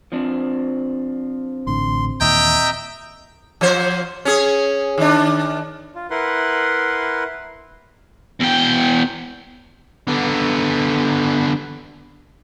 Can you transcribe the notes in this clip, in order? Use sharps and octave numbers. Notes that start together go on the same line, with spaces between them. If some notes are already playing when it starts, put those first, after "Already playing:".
F3 C4 D4
A1 A2 D3 C6
D#2 A#2 E3 D#5 E5 G5 A#5
F3 C5
C#4 G#4
D#3 D4
F4
E4 A#4 B4 F#5 C6
E2 G5
D3 B3